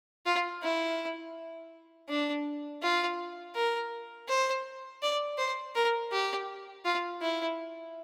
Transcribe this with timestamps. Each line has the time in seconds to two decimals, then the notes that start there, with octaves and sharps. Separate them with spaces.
0.26 F4
0.62 E4
2.09 D4
2.82 F4
3.55 A#4
4.29 C5
5.03 D5
5.38 C5
5.75 A#4
6.12 G4
6.85 F4
7.22 E4